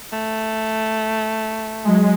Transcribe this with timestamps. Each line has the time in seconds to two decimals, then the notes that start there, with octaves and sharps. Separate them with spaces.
0.13 A3
1.85 F#3 G#3